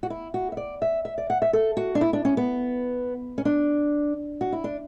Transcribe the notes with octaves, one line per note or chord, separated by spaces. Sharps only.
F#4
E4
F#4
E5
D5
E5
E5
D5
F#5
E5
A4
F#4
D4
E4
D4
C#4
B3
C#4
D4
F#4
E4
D4